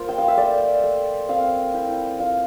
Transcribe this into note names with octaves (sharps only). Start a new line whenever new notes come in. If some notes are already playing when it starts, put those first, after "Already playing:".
Already playing: A#3 F4 C5
G5
F5
E5
A3 D5
A3
C4 F5
E4 G5
F4 F5